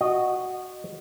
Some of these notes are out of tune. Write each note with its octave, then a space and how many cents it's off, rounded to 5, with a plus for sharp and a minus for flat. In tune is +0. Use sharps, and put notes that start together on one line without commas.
F#4 +0 D#5 -20